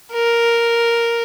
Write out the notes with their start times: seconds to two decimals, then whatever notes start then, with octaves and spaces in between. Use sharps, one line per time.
0.14 A#4